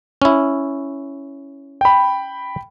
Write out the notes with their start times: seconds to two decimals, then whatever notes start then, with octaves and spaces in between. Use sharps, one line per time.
0.22 C#4 E4
1.81 G5 B5